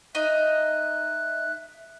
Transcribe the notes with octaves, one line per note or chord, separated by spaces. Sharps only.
D#4 E5 F#6